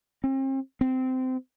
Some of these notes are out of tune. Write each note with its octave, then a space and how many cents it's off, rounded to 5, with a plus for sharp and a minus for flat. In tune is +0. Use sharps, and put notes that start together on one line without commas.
C4 +40
C4 -20